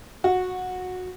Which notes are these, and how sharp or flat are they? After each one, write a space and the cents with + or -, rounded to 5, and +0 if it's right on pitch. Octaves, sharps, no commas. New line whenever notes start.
F#4 -15